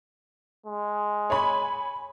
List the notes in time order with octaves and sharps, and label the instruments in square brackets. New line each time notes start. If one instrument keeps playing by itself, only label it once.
[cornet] G#3
[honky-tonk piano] C#5 G#5 B5